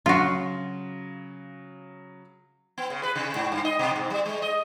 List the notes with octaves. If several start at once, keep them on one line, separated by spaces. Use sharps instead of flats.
C#3 F#3 F4 F#4
B3
C#3
B4
C3
G#2
G2
D#5
B2
G#2
G3
G#3
D#5